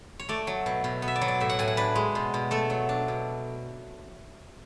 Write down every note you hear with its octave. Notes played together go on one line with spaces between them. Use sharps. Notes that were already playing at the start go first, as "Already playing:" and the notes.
C#5
A3 D5
F#3
B2
B2
B3
E5
D5
F#3
D5
A2 E5
F#5
A2 G#5
F#5
D4 B4
G#3
B2
B2
A3 A4
F#3
D4
B2